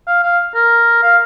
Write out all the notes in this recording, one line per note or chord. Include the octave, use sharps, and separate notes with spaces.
F5
F5
A#4
F5